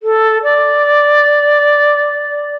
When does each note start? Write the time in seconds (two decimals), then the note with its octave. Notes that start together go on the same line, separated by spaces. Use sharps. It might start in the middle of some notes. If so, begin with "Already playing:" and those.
0.02 A4
0.43 D5